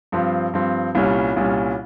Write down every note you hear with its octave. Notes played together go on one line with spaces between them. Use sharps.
G2 F3 C4
G2 F3 C4
C2 A#2 G3 C#4
C2 A#2 G3 C#4